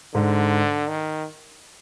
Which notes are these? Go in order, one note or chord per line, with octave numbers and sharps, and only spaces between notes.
G#2 D3
D#3